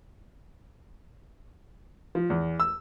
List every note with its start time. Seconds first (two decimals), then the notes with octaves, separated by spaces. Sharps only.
2.15 F3
2.30 E2
2.60 E6